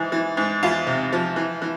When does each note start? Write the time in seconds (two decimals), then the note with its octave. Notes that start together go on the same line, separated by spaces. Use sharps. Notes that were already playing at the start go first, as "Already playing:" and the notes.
Already playing: G#2 E3
0.12 E3
0.37 G#2
0.63 E2 F4
0.87 C3
1.13 F3
1.36 E3
1.62 E3